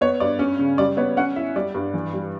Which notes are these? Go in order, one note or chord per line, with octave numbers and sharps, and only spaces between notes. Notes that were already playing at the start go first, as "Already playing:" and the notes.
B3 C#5
G2 D5
C#4
C#3
G3 D5
B3 C#5
C#4 F#5
E4 E5
G3 D5
G2
E3
G3